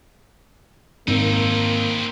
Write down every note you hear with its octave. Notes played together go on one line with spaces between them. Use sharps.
G#1 A#3 C4 D#4